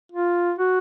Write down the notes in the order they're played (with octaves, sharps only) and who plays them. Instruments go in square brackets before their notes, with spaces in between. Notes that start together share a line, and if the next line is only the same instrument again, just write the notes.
[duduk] F4
F#4